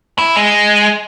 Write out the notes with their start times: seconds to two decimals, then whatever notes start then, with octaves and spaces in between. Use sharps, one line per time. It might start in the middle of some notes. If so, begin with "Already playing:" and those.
0.18 E4
0.36 G#3